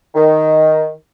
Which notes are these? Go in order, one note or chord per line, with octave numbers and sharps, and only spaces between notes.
D#3